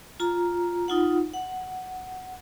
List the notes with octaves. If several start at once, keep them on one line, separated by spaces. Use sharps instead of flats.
F4 A#5
D#4 F4 F#5
F#5